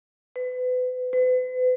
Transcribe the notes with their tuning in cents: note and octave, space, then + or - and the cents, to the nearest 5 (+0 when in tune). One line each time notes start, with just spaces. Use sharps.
B4 +30
B4 +40